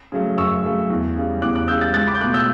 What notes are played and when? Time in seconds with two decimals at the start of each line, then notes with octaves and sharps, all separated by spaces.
0.12 C#3 F#3 A3
0.37 F#2 C#6 E6
0.64 C#3 F#3 A3
0.90 E2
1.16 C#3 G3
1.42 E2 D6 F#6
1.55 D6 F#6
1.68 C#3 E6 G6
1.72 G3
1.81 F#6 A6
1.94 C#2 F#6 A6
2.07 B5 D6
2.15 G6
2.20 B2 A3 D6 F#6
2.34 E6 G6